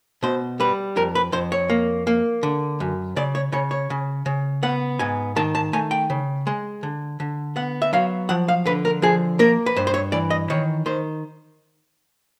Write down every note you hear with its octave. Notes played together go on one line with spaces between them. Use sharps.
B2 C5
G3 B4
F2 A#4
B4
F2 C5
C#5
A#3
A#3
D3
F#2
C#3 D5
C#5
C#3 C#5
C#5
C#3
C#3
B3 F#5
G#2 G#5
D#3 A5
A5
A3 G#5
G5
C#3
G#3
D3
D3
B3 F#5
E5
F#3 F5
F3 F#5
F5
D3 B4
A#4
F3 G#4
A#3 A#4
B4
G2 C5
C5
C#5
E3 D5
D#5
D#3 C#5
D#3 C5